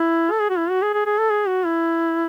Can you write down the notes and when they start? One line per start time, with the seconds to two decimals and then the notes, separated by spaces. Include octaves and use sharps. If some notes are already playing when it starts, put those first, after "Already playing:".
Already playing: E4
0.31 A4
0.40 G#4
0.50 F#4
0.58 E4
0.70 F#4
0.82 G#4
0.94 G#4
1.06 G#4
1.18 A4
1.30 G#4
1.48 F#4
1.66 E4